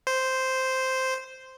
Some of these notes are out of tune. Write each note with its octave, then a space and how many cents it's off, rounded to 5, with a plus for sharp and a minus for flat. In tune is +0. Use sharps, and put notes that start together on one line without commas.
C5 -5